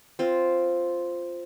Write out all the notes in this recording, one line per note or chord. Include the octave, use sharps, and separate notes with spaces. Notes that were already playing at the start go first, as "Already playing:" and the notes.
C4 F4